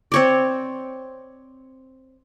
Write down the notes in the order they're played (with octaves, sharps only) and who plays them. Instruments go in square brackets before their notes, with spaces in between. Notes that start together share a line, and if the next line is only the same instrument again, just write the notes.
[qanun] C4 C#5 D5